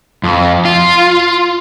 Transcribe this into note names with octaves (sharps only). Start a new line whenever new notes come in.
F2
F4